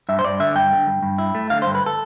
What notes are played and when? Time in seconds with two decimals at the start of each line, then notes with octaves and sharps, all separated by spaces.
0.09 G2 E5
0.19 C5
0.24 G2 D5
0.40 D3 E5
0.55 G2 G5
0.72 D3
0.87 G2
1.03 G2
1.18 E4
1.35 A3
1.50 D3 F5
1.62 G2 C5
1.75 B4
1.86 A4